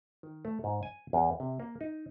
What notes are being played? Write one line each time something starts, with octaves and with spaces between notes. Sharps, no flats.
D#3
A3
G#2
G#5
E2
C3
A#3
D#4